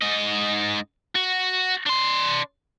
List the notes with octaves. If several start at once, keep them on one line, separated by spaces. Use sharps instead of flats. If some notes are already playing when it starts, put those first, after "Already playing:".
G#2 D#5
F#4
D4 C6